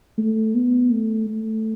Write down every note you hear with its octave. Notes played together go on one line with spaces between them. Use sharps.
A3
B3
A3
A3